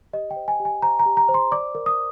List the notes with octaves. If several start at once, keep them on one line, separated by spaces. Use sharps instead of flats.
G4 D#5
G5
C5
G#5
G4
G#5
C5 A#5
A#5
G4
A#5
C5
C6
D5 D6
A#4
D#6